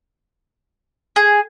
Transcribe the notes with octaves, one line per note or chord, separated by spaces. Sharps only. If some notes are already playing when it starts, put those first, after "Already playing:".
G#4